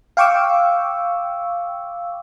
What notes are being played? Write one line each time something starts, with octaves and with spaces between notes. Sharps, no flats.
F5 G5 C#6 D6 E6